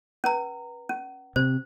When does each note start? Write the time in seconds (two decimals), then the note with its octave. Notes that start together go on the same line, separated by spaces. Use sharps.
0.24 C#4 B4 A#5
0.89 C#4
1.36 C3 C5